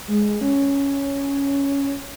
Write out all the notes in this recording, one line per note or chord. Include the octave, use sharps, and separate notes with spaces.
G#3
C#4